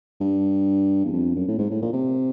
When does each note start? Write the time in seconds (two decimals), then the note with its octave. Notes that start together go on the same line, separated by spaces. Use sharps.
0.20 G2
1.05 E2
1.13 F2
1.35 F#2
1.48 A2
1.58 G#2
1.70 A2
1.81 A#2
1.93 C3